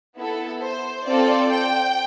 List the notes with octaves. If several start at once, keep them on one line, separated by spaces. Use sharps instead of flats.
B3 E4 A4
C5
C4 F4 A4 D5
G5